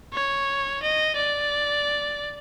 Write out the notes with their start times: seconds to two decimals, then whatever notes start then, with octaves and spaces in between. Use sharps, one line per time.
0.13 C#5
0.83 D#5
1.17 D5